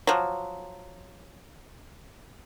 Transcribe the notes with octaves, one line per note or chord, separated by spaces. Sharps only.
F3 F#3